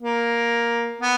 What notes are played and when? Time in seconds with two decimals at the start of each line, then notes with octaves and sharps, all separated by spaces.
0.02 A#3
1.01 B3